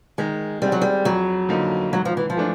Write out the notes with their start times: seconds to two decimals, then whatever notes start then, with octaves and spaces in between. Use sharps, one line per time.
0.18 D#3 G#3
0.62 G3 G#3 C4
0.72 F#3
0.82 G3
1.05 F2 F#3
1.49 D3 F3 A#3 D#4
1.92 G#2 F#3
2.05 F3
2.17 E3
2.30 F3
2.36 E3 A3 D4